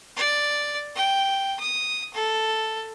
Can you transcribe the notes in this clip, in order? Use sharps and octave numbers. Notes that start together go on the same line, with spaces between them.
D5
G5
D#6
A4